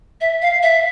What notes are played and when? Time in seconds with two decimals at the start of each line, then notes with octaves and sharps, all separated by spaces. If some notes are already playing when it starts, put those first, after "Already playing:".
0.21 E5
0.42 F5
0.63 E5